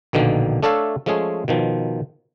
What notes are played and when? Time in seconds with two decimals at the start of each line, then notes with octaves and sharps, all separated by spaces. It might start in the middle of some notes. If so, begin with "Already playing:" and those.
0.13 A#1 B2 D3 D#3 A#3
0.63 A3 D4 A4 C#5 E5 F5
1.06 F3 G#3 A3 C#4 G#4
1.48 B2 D#3 F3